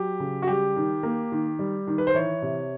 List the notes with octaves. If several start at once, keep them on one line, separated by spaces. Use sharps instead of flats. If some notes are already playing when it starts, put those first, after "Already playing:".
Already playing: F#3 G4
C#3
F#4
G3 G4
D#3
A#3
D#3
G3
D#3
B4
C5
E3 C#5
C3